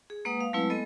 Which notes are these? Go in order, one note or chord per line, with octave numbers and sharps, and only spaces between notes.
G#4
G#3 A#3 B4 F#5 D#6
F5
F#3 G#3 A3 C4 E4 B4
G#3 B3 A4 D#5